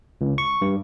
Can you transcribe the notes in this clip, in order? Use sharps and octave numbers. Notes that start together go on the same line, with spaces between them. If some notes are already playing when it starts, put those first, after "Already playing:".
C#2
C#6
G2